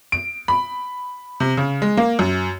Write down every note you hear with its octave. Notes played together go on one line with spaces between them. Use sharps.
D7
B5
C3
C#3
G#3
A#3
F#2